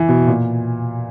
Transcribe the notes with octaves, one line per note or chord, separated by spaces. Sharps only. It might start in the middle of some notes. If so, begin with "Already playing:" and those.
Already playing: E3
B2
A#2